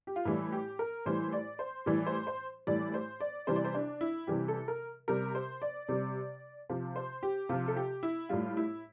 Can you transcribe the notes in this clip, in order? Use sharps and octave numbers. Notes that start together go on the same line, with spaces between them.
G4
F4
A2 E3 G3 E4
G4
A#4
A2 E3 G3 C5
D5
C5
A2 E3 G3 D5
C5
C5
A2 E3 G3 D5
C5
D5
C3 E3 G3 C5
D5
C5
D4
E4
C3 E3 G3 G4
A4
A#4
C3 G3 A#4
C5
D5
C3 G3
C3 F3
C5
G4
C3 F3 F4
A4
G4
E4
A2 G3 F4
E4